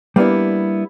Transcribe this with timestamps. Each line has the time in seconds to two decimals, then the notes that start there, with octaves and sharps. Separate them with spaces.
0.16 G3 A#3 B3 D4 E4